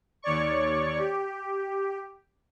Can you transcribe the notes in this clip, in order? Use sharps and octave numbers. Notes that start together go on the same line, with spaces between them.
D#2 C#5 D5 C#6
G4